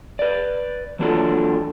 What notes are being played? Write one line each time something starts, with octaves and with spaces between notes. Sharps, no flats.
B4 D5
E3 F#3 A#3 D4 F4 A4